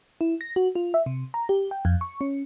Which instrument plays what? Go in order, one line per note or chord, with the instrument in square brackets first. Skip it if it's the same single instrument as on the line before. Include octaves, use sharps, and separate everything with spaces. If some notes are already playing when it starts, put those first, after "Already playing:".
[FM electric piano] E4
A#6
F#4
F4
E5
C3
A#5
G4
G5
F2
C#6
C#4